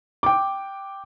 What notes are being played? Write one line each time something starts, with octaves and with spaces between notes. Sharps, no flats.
G5 D6